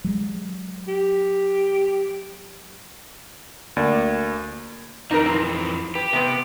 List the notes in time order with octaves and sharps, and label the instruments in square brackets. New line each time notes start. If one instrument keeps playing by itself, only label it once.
[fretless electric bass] F#3 G#3
[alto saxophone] G4
[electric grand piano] D2 A#3 D5
[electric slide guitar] F2 E3 [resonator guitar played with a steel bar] D#4 A#4
[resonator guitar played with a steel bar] C4
[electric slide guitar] G4 [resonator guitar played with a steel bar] B4
[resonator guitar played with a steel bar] C3 B3